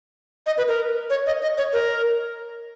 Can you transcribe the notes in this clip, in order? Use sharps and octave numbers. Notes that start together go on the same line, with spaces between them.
D#5
B4
A#4
C#5
D#5
D#5
C#5
A#4